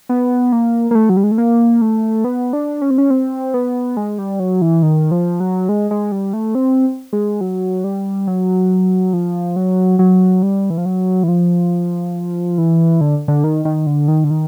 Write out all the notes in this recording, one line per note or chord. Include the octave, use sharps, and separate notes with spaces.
B3
A#3
A#3
A3
F#3
G3
G#3
A3
A#3
A3
B3
D4
C#4
C4
C#4
C4
B3
G#3
G3
F#3
E3
D#3
F3
F#3
G#3
G#3
G3
A3
C4
G#3
F#3
G3
F#3
F3
F#3
F#3
G3
E3
F3
F#3
E3
F3
E3
D3
D3
D#3
D#3
D3
D#3
D3
D#3